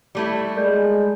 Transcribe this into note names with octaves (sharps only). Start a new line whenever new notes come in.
G3 A3 E4
G#3 A#4 D5 G6